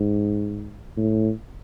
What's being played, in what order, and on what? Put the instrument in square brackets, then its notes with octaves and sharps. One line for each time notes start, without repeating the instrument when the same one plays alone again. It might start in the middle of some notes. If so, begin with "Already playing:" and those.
Already playing: [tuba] G#2
A2